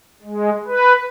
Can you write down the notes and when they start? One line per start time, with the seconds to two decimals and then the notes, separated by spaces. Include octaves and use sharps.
0.23 G#3
0.67 B4